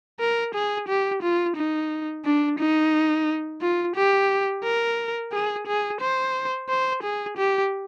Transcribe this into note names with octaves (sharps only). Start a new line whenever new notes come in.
A#4
G#4
G4
F4
D#4
D4
D#4
F4
G4
A#4
G#4
G#4
C5
C5
G#4
G4